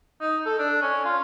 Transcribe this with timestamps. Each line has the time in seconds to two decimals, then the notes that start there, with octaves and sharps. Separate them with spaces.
0.21 D#4
0.46 A4
0.59 D4
0.82 C#4
1.05 F4